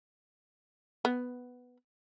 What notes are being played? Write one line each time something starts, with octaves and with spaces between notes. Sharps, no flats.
B3